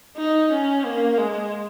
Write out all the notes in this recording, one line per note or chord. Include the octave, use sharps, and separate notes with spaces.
D#4
C#4
A#3
G#3